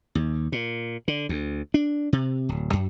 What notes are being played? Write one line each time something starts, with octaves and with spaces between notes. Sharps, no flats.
D#2
A#2
D3
D2
D4
C3
D1
F#2